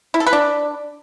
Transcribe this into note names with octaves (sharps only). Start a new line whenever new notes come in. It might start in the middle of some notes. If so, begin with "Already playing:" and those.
E4
A4
B4
D4